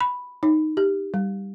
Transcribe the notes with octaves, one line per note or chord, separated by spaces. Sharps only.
B5
D#4
G4
G3